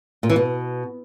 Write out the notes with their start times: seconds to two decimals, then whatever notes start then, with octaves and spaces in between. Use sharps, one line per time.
0.23 A#2
0.29 E3
0.36 B2